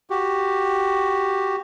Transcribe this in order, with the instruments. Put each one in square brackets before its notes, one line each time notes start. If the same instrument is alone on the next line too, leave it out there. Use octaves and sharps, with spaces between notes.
[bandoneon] F#4 G4